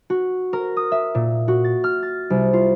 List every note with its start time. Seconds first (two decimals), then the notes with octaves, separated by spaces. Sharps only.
0.10 F#4
0.53 A#4
0.77 D#6
0.92 E5
1.15 A#2
1.48 F#4
1.64 A6
1.84 F6
2.03 A6
2.30 C2
2.53 F4